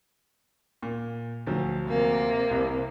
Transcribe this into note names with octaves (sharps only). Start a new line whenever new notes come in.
A#2
D2 F3 F#3
C3 A#3
C2